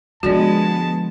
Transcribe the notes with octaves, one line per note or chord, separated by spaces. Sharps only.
D3 F3 G#3 B3 F#4 D5 A5